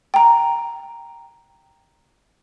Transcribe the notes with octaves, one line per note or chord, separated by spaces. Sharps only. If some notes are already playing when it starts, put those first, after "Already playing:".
G5 A#5